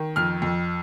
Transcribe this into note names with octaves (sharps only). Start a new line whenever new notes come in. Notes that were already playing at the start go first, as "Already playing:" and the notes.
Already playing: D#3
F2 F6
F2